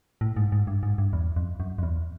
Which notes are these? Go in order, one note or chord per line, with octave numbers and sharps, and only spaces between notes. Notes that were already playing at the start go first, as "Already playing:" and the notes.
A2
G#2
G#2
G2
G#2
G2
E2
F2
F#2
F2
E2